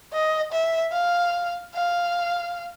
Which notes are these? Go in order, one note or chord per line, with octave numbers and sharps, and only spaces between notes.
D#5
E5
F5
F5